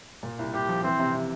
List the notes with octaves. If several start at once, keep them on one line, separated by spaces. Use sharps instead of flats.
A#2
C2
C2 G4
F3
E3 C4
C3
C3